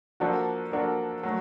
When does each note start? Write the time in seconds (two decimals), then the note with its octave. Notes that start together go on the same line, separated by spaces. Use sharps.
0.20 F3 A#3 D4 F#4 A4
0.72 F3 A#3 D4 F#4 A4
1.23 F#3 A3